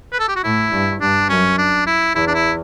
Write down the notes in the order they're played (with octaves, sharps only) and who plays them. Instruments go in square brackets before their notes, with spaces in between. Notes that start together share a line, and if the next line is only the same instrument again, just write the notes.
[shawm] B4
A4
G4
F#4
[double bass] A2 [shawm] E4
[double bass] G2
[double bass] G2 [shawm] D4
[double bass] F#2 [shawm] C#4
[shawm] D4
E4
[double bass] E2 [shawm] E4
[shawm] D4
E4